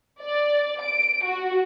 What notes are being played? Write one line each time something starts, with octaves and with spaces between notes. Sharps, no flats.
D5
D7
F#4